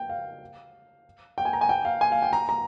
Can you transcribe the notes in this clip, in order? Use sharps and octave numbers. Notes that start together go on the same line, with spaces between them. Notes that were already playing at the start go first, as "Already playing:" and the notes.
Already playing: G5
F5
G5
G#5
A#5
G#5
G5
F5
G#5
F5
G5
A#5
A#5